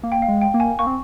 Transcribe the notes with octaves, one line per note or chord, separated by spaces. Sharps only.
A#3
G5
F5
G#3
G5
A#3
G#5
A#3 C#6
C4